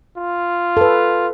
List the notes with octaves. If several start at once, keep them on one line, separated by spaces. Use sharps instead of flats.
F4
A4 B4